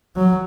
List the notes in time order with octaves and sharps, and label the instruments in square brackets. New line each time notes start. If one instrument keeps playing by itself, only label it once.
[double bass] F#3